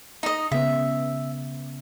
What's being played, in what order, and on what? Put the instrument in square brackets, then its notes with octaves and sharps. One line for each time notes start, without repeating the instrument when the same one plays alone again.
[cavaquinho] D#4 D#5
[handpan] C#3 B3 [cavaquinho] E5